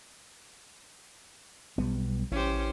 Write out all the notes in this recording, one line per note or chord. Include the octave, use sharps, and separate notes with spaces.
B1 G3 B3
A1 E3 C#4 G4 C5